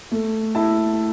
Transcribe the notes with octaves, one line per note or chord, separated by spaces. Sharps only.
A3
E4 A5